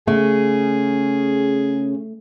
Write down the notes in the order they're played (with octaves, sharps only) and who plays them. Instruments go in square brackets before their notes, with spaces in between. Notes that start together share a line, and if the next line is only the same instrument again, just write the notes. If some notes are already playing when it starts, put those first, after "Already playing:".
[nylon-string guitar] C#3 [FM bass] A3 [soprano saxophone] G#4